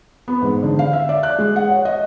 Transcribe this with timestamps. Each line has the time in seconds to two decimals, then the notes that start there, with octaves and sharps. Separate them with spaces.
0.28 B3
0.42 G#2
0.63 D3
0.79 F5
0.93 E5
1.09 D5
1.23 F#6
1.39 G#3
1.56 F#5
1.69 C#5
1.85 D#5